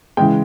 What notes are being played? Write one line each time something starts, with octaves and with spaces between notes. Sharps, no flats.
C#3 E3 G#3 G5